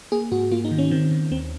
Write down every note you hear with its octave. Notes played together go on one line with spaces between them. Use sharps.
A#3 G#4
G#2 F#4
A#3 F4
D#4
D#3
C#4
D#3 C4
D#3
D#2 C4